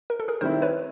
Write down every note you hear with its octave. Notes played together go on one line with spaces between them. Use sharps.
A#4
A4
G#4 A#4
D#3 G3 C4 E4 A#4 C5
B4 C#5